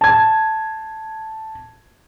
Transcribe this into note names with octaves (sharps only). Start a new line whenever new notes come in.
A5 G#6